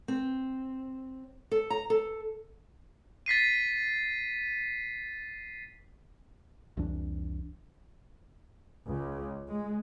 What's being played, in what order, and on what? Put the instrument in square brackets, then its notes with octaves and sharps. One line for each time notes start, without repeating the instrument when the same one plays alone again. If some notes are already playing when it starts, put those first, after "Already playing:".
[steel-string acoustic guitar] C4
A4
A#5
A4
[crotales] A6 B6 C7 D#7
[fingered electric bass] C2 F2 E3 D4
[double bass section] C#2
G#3